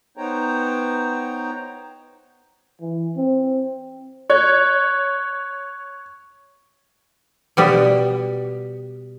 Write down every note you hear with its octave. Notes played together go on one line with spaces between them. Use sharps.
B3 D#4 C5 C#5 G5 A#5
E3
C4
C#5 C#6 F#6 G#6
B2 G3 B3